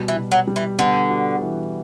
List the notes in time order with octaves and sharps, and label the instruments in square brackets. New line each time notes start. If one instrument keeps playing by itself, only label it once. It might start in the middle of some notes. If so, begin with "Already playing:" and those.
Already playing: [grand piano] B2 G3
[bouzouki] E3
[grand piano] B2
[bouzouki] F#3
[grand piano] G3
[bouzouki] E3
[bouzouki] D3 [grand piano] B3
[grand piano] F#4
E3